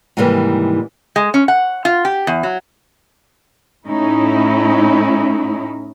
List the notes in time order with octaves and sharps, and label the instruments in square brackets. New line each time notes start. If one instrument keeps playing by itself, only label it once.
[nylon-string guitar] G#2 C3 D#3 E3 G3 A#3
[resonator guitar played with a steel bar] G#3
C#4
F#5
F4
G4
E2
F#3
[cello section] A2 C#4 D#4 E4